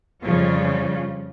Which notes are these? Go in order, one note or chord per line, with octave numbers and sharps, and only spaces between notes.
F2 C#3 F3 G3 F4